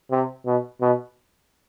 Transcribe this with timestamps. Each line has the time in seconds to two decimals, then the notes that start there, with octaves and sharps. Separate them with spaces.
0.11 C3
0.46 B2
0.81 B2